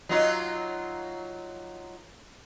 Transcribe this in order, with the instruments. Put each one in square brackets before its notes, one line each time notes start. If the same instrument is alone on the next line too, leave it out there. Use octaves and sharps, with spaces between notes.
[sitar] F#3 D#4 F4